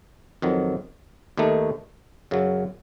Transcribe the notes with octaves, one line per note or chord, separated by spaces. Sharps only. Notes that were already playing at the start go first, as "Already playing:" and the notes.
F2 D#3 F#3
D#2 D#3 A3 D#4
F#2 C#3 F#3